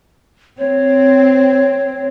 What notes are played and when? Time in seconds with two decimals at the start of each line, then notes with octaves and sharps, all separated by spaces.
0.59 C4 C#5